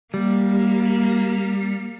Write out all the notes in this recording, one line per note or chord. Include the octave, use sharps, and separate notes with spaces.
G3 A#3